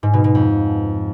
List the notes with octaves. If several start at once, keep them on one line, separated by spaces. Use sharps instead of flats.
G#2
B2
B2
F2